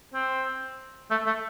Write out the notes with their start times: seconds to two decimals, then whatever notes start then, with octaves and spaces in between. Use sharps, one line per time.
0.14 C4
1.11 A3
1.27 A3